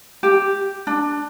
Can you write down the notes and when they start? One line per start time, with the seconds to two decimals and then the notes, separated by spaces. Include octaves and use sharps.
0.23 G4
0.87 D4